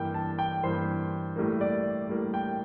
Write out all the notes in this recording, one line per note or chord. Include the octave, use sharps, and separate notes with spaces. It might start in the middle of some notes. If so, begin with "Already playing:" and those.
Already playing: G2 E3 A#3 G5
A5
G5
G2 E3 A#3 C5
A2 G3 A#3
D5
A2 G3 A#3
G5